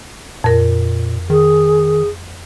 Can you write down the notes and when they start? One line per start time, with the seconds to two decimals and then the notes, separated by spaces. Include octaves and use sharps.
0.44 F2 A#2 A#4
1.30 D#3 G#4